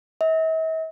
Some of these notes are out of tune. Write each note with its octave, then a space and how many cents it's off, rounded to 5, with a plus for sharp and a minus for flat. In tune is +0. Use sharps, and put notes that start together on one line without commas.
E5 -45